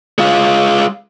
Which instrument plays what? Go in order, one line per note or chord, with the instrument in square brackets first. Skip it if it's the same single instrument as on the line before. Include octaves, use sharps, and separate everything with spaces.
[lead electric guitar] G#3 F4